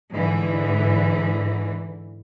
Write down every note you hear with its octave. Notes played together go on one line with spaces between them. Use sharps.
G#2 D3 E3